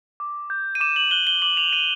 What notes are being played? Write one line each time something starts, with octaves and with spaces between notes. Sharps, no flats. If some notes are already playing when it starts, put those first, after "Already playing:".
D6
G6
D#7
D6 E7
F#7
F#6 G7
G7
D6 F#7
F7
G6 D#7